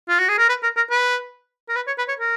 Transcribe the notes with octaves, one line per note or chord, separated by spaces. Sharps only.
F4
F#4
G#4
A#4
B4
A#4
A#4
B4
A#4
B4
C#5
B4
C#5
A#4